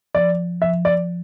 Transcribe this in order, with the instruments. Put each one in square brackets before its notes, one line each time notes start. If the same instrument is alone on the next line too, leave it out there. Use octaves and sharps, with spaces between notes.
[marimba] F3 [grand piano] D5
[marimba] F3 [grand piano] E5
[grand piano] D5